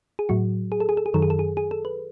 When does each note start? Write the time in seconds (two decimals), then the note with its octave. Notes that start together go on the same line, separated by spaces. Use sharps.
0.19 G#4
0.29 A2 F#3 F#4
0.72 G#4
0.80 A4
0.89 G#4
0.97 A4
1.06 G#4
1.14 F#2 D#3 F#3 A4
1.22 G#4
1.30 A4
1.39 G#4
1.57 G#4
1.71 A4
1.85 B4